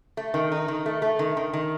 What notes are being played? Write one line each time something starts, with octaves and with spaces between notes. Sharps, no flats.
A3
D#3
D#4
D#3
A3
A3
D#3
D#3
D#3